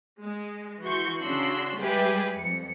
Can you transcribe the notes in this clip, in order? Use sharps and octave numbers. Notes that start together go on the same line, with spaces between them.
G#3
E3 F#4 C6 C#6 G6
C#3 D4 F#4 C6 E6 F#6
G3 G#3 G4 G#4 B4 E5
F2 C#7